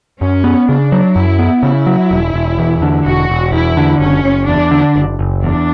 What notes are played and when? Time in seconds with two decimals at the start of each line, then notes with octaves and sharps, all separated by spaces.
0.21 F#2 C#4
0.44 B3
0.69 C#3 D4
0.92 F#3
1.16 F#2 E4
1.39 B3
1.63 C#3 E4
1.86 F#3
2.11 E1
2.34 E1
2.59 E2
2.82 D3
3.05 E1 F#4
3.30 E1
3.52 E2 E4
3.77 D3
4.00 F#1 C#4
4.24 F#1
4.48 E2 D4
4.71 D3
4.96 F#1
5.19 F#1
5.43 E2 D4